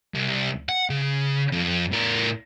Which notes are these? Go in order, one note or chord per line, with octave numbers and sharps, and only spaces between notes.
C2
F#5
C#3
F2
A2 A#4